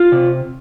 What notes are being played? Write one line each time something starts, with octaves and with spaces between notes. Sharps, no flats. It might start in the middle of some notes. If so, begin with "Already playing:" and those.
Already playing: F4
C3